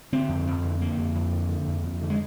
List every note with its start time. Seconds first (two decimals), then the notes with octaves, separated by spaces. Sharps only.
0.12 D3 C4
0.29 F2
0.47 F2
0.64 D3
0.80 D3 A#3
0.98 F2
1.15 F2
1.32 D3
1.49 D3
1.67 F2
1.84 F2
2.02 D3
2.10 G#3